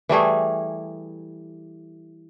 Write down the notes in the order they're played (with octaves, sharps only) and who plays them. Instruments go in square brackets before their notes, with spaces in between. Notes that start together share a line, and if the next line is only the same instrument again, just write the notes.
[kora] E3 G3 A3 G#4